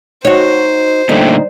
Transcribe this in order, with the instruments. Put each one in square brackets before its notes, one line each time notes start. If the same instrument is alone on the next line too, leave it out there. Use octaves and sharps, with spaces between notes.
[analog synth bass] D#4 [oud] F#4 C#5 [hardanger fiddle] C5
[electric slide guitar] A#2 D3 A3 [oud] G3 [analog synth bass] D#4